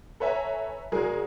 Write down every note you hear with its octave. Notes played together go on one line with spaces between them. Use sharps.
A4 B4 C#5 E5 G#5 A#5
F1 F#3 G#4 A#4